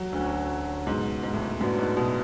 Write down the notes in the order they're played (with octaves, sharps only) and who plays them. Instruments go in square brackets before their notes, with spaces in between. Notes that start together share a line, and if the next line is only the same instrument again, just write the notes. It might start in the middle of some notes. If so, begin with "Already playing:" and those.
Already playing: [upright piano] F#3
[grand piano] D2 D3 A3 C#4
[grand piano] C#2 B2 F#3 [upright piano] G#2
[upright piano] G#2
A2
G#2
[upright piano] F#2 [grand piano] A2 F#3 B3 D4
[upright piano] G#2
B2